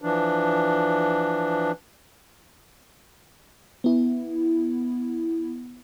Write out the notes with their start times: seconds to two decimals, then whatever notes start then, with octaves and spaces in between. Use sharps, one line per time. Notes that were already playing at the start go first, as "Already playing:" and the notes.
0.02 E3 F3 D4
3.84 B3 E4